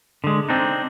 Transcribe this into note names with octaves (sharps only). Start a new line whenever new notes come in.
D3 G#3
C4 D4 D#4